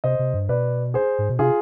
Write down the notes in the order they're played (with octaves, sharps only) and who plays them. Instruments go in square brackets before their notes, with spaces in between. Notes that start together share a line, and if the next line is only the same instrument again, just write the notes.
[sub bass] C3 [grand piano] C5 D#5
[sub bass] C3
G2
[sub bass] B2 [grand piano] B4 D5
[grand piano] G#4 C5
[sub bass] G#2
B2
[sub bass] C3 [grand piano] F4 G#4